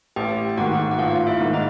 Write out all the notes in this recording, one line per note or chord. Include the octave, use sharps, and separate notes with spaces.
A1 G4 G5
G5
G#2 D#3 F#4 F#5
F#5
A1 F4 F5
E4 E5
G#2 D#3
D#4 D#5